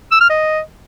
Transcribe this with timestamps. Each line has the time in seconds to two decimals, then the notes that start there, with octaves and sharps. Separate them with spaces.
0.11 E6
0.21 F6
0.30 D#5